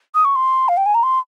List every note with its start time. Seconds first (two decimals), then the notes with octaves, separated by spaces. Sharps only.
0.14 D#6
0.25 C#6
0.35 C6
0.68 F5
0.77 G5
0.86 G#5
0.94 A#5
1.03 C6